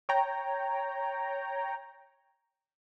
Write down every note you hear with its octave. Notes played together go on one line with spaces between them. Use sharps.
C#5 G5 A#5